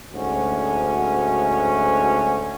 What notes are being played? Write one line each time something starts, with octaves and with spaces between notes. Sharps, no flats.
D2 G#2 C#4 F#4